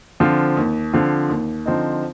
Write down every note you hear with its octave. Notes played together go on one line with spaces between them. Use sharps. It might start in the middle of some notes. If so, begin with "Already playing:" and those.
D3 F3 C4 F4
D#2
D3 F3 C4 F4
D#2
D3 F3 C4 D#4